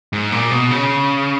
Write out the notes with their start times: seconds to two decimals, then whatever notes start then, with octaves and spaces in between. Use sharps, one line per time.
0.13 G#2
0.32 A#2
0.51 B2
0.71 C#3